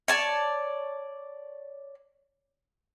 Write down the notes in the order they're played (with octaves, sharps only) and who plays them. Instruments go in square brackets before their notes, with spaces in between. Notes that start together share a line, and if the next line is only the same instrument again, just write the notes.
[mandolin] C#5 D5 A5